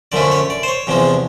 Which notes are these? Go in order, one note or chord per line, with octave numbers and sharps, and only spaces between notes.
F#2 D3 F3 A3 C#4 D5
C#5
D5
C5
C#5
E2 C3 F3 G#3